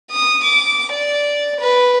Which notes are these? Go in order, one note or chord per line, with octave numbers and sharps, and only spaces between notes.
D#6
D6
D5
B4